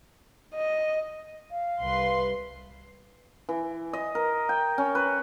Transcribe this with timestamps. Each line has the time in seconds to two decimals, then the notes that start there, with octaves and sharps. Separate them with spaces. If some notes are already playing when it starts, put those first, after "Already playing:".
0.54 D#5
1.51 F5
1.82 C2 B4 C6
3.49 E3
3.93 D#5
4.15 A#4
4.49 G5
4.78 C#4
4.95 B4